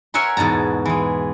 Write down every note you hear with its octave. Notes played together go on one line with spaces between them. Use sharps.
A#4 C#5 E5 F#5 G#5 C6
E2 G#2 B2 A5 A#5
E3 G#3